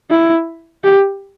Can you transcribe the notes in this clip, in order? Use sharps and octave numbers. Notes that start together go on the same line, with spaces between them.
E4
G4